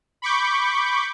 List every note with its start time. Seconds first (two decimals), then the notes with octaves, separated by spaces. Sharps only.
0.22 B5 C#6 D6 G6